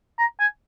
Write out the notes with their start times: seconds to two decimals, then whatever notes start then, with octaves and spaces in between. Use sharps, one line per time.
0.19 A#5
0.40 G#5